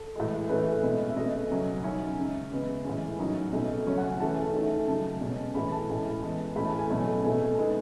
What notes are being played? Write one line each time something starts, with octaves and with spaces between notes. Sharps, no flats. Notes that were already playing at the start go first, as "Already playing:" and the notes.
Already playing: A4
A2 E3 G#3
E3 A3 C#4 B4
B2 G#3 C#4
E5
B2 A3 C#4 D#5
C#3 F#3 C#4
D#3 F#3 C#4 E5
C#3 G#3 C#4
C#3 G#3 B3
A2 E3 G#3 C#4
D#3 F#3 C#4 D#5
B2 A3 C#4
C#3 F#3 C#4 C#5
F#5
G#5
E3 A3 C#4 A5
D#3 A3 C#4
C#3 F#3 C#4 A5
B2 G#3 C#4
A2 E3 A3 C#4 B5
A5
A2 G#3 C#4
E3 G#3 B3
A2 E3 A3 C#4 B5
A5
G#5
B2 F#3 A3 C#4 A5
B2 A3 C#4 G#5
D#3 G#3 B3